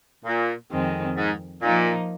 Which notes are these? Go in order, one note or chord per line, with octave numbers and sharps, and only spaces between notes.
A#2
F2 D#3 G#3 C4
G#2
A#2 F3 A#3 D#4